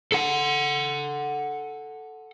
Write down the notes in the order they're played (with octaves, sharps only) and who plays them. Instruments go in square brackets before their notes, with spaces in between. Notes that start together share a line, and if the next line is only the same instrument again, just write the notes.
[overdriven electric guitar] A4 F#5